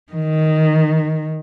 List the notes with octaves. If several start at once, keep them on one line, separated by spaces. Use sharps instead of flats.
D#3